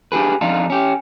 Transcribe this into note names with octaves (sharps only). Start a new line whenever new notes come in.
D4 G4 G#4 B4
F2 D4 D#4 F4
C#4 G4